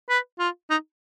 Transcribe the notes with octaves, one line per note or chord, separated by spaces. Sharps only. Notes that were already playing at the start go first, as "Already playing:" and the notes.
B4
F4
D#4